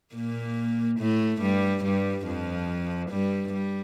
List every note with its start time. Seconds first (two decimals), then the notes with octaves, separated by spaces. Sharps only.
0.14 A#2 A#3
1.00 A2 A3
1.42 G2 G3
1.84 G2 G3
2.26 F2 F3
3.11 G2 G3
3.53 G3